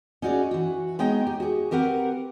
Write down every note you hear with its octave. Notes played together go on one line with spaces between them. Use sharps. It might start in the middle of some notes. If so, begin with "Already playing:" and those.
C#4 D#4 F#4 G#4 D5
E3 F#4
G#3 B3 D#4 C#5 D#5 G5
G4
F#4 G#4
C4 G4 A#4 B4 F#5